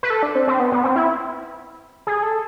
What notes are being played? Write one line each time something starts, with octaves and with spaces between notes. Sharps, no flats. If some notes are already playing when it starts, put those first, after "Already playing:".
B4
A4
D4
C4
C4
B3
B3
C4
E4
G#4
A4